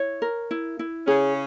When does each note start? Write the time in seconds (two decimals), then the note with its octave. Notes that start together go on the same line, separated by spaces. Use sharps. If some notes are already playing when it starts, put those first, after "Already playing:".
Already playing: E4 C#5
0.22 A#4
0.51 E4
0.79 E4
1.07 C#3 C#4 G#4